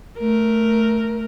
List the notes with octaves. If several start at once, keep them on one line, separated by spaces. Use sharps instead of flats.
A3 A#4